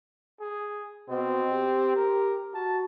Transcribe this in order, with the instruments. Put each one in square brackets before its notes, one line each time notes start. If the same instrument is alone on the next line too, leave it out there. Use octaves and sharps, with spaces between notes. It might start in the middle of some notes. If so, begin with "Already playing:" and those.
[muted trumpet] G#4
[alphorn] B2 [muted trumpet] C4
[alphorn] G4
[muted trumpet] A#4
[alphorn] F#4 [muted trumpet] A5